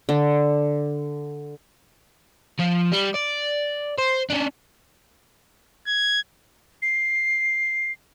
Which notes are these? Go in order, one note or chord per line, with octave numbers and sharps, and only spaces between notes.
D3
F3
G3
D5
C5
C#4 D4
G#6
C7